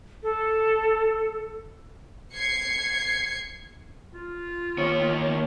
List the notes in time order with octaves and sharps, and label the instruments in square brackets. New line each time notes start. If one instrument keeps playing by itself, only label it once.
[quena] A4
[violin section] G#6 C7 C#7
[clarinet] F4
[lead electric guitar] D#2 C#5